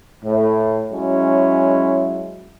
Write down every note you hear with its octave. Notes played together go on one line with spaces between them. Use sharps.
A2
F#3 G#3 C#4 E4